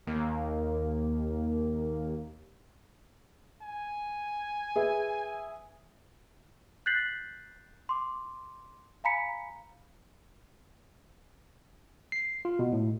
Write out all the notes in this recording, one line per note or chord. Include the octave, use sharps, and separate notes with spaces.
D#2 A#3
G#5
G#4 B4 E5
F#6 G6 A6 B6 C7 F#7
C6 D6
F5 G#5 A#5 B5 B6 C#7
C7
F4
B2
A2